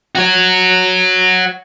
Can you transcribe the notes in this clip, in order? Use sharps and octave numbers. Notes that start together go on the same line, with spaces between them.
F#4 C#5